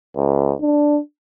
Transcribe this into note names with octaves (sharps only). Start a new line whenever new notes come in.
C#2
D4